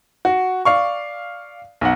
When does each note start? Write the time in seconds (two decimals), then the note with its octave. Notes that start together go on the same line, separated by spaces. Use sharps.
0.25 F#4
0.65 D5 F5 C#6
1.81 B1 F#5